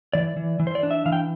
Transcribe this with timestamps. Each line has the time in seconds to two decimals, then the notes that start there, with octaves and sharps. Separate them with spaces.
0.13 E3 D5
0.37 E3
0.60 E3
0.67 C5
0.75 D5
0.83 D4
0.91 E5
1.06 E3 F5
1.12 G5